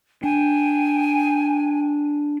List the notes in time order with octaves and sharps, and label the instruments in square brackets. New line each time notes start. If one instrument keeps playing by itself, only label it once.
[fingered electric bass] D4 [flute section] G5 G#5